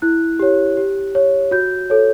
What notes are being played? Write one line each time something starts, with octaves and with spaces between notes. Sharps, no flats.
E4 F#6
G4 C#5
G4
C#5
F#4 G6
A4 C#5